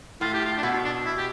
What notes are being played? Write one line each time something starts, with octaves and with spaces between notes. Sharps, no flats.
A2 F4
G4
F4
D4
B2 E4
D4
E4
G4